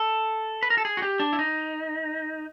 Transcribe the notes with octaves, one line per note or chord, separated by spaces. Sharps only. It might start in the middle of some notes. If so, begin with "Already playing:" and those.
Already playing: A4
B4
A#4
A4
G#4
F#4
G4
D4
E4
D#4